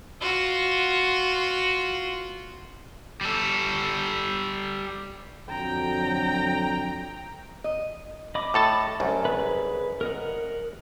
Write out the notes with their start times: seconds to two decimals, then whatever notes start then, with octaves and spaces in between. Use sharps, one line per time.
0.21 F4 F#4
3.21 G3 A4
5.49 F2 D3 F#3 G5 A#5
7.64 D#5
8.35 D#5 B5 D6
8.54 A2 A4 A5
9.00 C2 F#2
9.25 G#4 B4
10.01 A#4 D#5 F#5